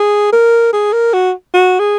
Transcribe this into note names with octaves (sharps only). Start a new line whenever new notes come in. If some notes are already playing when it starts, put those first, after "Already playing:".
Already playing: G#4
A#4
G#4
A#4
F#4
F#4
G#4